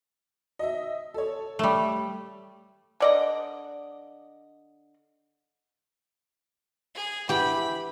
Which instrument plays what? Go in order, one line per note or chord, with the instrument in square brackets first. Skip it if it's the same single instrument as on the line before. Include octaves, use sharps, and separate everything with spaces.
[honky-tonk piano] D#5 E5
A4 C#5
[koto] G3 A3
[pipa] D3 D5 D#5
[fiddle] G#4
[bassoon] E3 [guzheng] G4 G5 [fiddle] B5